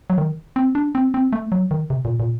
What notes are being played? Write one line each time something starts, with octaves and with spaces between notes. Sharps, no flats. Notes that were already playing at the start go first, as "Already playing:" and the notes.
F#3
D#3
C4
D4
C4
C4
A3
F#3
D#3
C3
A#2
A#2